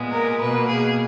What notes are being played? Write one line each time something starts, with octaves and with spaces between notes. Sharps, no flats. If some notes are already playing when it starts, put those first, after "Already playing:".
Already playing: A#2 G#3 B3
A#4
B2 A#3 B4
G#4